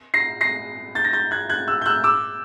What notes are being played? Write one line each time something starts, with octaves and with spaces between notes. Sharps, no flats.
A#6 C7
A#6 C7
G6 A6
A#6
G6 A6
F#6 G#6
F#6 G#6
E6 F#6
G6
E6 F#6
D6 E6